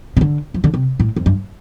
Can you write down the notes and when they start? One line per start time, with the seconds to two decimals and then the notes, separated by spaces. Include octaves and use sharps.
0.17 C3
0.21 D3
0.54 F3
0.64 D3
0.74 C3
1.00 A2
1.16 F2
1.26 G2